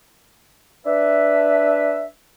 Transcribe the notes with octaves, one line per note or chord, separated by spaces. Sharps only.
D4 B4 E5